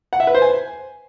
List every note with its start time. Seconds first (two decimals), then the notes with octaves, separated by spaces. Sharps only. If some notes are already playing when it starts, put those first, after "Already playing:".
0.13 F#5
0.20 E5
0.27 B4
0.35 C5
0.42 G#5